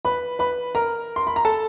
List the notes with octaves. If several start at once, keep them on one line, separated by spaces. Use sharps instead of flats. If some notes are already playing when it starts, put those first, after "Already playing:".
B4 B5
B4 B5
A#4 A#5
C6
B5
A#5
A4 A5